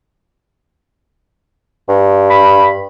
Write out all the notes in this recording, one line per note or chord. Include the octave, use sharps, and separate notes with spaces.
G2
B5